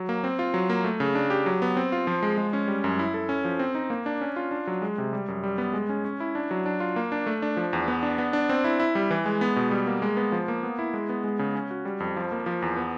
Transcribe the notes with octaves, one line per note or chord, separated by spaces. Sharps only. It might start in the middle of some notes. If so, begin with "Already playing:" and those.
Already playing: F#3
A#3
C4
F4
F#3
A#3
A3
C#3
D4
G4
F#3
B3
C4
F4
F3
G#3
G#3
C#4
G3
F#2
E4
A4
C#4
F3
C4
D#4
A#3
D4
C#4
F4
D4
F#3
G#3
C3
G3
F#2
G3
B3
G#3
C#4
C#4
E4
D4
F#3
D4
F4
A#3
D4
A3
D4
F3
E2
B3
D4
B3
D4
C4
E4
E4
G3
E3
G#3
B3
B2
G3
A#3
G#3
B3
F3
A#3
B3
E4
G#3
B3
G#3
C#3
C#4
F#4
G3
F2
F3
A#3
F3
E2
B3